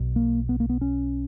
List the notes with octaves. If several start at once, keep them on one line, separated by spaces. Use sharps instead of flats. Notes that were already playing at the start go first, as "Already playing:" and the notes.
Already playing: B1 B2
A#3
B3
A#3
B3
C#4